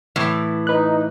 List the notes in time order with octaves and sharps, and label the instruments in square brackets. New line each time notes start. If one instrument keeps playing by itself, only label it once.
[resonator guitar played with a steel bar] A2 E3
[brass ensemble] D#4 [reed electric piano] B4 F#6